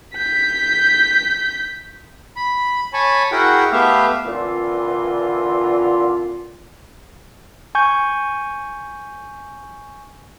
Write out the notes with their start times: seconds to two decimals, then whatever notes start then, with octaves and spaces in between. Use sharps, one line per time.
0.15 G6 B6
2.36 B5
2.93 C#5 G#5 A5 B5 C#6
3.32 E4 F#4 G#4 A#4 F#5 G5
3.72 A3 B3 G4 E5 F5
4.25 A#2 D3 E3 C4 F4
7.75 G#5 C#6 G6